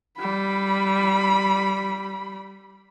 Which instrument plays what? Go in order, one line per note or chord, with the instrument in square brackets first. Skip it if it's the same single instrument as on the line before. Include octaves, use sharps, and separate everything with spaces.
[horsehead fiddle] G3 B5